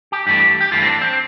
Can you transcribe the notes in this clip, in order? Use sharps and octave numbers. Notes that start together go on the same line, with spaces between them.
G4
G2 E3 A3 G4
G4
G2 E3 A3 F4
C4
D4
C4